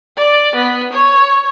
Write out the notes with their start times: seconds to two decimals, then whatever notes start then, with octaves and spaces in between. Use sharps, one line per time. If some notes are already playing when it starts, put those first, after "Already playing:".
0.17 D5
0.55 B3
0.93 C#5